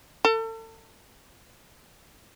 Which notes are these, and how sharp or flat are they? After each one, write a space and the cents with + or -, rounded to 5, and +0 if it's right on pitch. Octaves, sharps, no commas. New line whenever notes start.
A4 +35